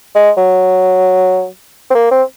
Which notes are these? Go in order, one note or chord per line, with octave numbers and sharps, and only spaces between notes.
G#3
F#3
C4
A#3
C4